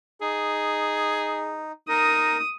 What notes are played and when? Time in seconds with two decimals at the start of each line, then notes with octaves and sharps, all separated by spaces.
0.21 D#4 G#4
1.88 D#4 A#4 D#6